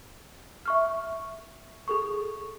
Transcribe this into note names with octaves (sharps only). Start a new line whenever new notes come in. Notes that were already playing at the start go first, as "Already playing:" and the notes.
E5 C#6 F6
G#4 A4 C#6